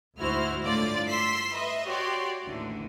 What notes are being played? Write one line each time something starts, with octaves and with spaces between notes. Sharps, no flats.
D2 G#2 E4 F#4 C5 F6
G1 A2 D3 F4 D5 A6
C6 E6 B6 C7
B4 D#5 E5
F#4 G4 C#5 D5 C6
A1 D#2 D3 E3